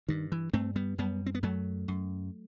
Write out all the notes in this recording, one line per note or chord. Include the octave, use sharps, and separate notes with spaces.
G2 D#3
E3
G2 A3 C4
G3 B3
F#2 G3 B3
C4
B3
F#2 F#3 A3
F#2